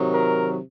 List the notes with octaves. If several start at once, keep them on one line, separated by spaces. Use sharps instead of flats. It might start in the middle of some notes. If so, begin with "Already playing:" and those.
Already playing: C3 D#3 F#3
A#4